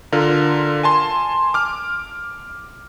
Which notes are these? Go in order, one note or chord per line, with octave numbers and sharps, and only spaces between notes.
D3 F4 A#4
G#5 A5 C6
D6 F6